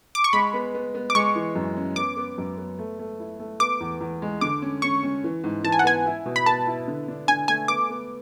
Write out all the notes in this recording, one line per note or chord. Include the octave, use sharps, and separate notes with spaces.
D6
C#6
G#3 B5
B3
B3
B3
D6
G#3 C#6
E3
F#2
C#4
B3 D6
B3
F#2
B3
A3
A3
E4
A3
B3 D6
E2
E2
G#3
D3 D6
C#4
C#4 C#6
C#4
E3
G#2
E3 A5
G#5
F#5
B3 G#5
E4
B2
B5
B3 A5
E4
D3
D4
D3 G#5
A3 G#5
B3 D6
B3